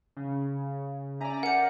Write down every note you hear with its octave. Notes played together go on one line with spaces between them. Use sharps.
C#3
C#4 D5 E5 G#5 A#5
A#4 F#5 G6 C#7